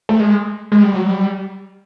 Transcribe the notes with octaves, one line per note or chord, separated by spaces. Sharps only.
A3
G#3
G#3
G3
F#3
G3